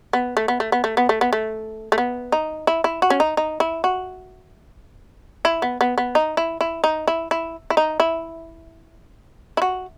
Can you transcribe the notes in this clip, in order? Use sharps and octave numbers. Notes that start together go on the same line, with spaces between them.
B3
A3
B3
A3
B3
A3
B3
A3
B3
A3
A3
B3
D#4
E4
E4
F#4
C#4
D#4
D#4
E4
F#4
E4
B3
B3
B3
D#4
E4
E4
D#4
E4
E4
E4
D#4
E4
E4
F#4